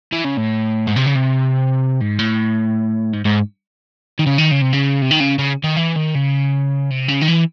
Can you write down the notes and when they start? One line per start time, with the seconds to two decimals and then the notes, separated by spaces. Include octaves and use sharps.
0.12 E3
0.24 C#3
0.37 A2
0.87 G#2
0.96 C3
1.06 C#3
1.15 C3
2.01 G#2
2.19 A2
3.13 G#2
3.25 G#2
4.19 D#3
4.26 C#3
4.38 D#3
4.51 C#3
4.62 C3
4.73 C#3
5.02 C3
5.11 D#3
5.20 C#3
5.39 C#3
5.64 D#3
5.76 E3
5.96 D#3
6.15 C#3
6.90 C3
7.08 C#3
7.21 D#3
7.28 E3